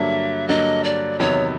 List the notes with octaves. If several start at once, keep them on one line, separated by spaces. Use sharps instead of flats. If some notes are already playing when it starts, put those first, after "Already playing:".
Already playing: G2 D3 F#3 A#3 E5
G2 D3 F#3 A#3 D#5
D5
E2 C3 D#3 F#3 B3 C#5